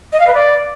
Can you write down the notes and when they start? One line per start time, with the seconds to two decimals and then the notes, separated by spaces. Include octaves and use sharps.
0.13 D#5
0.20 F5
0.27 B4
0.34 D5